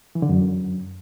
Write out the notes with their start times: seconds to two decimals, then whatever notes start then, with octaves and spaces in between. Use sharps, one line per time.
0.15 E3
0.22 D3
0.29 F#2